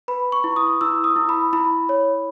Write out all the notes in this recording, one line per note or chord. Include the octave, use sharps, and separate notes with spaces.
B4 B5
C#6
E4
D#6
E4 E6
D#6
E4
B5
E4 B5
C#5